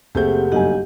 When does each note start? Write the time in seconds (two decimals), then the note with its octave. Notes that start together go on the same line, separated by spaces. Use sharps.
0.15 F#1 A3 C4 G4 G#4 F#5 G6
0.52 B1 G2 G4 D#5 F#5 G#5